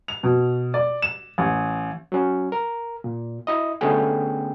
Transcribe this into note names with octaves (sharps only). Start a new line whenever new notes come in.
F7
B2
D5
E7
A1
F#3 C#4
A#4
A#2
E4 D#5
D3 A3 B3 C#4 G#4 G5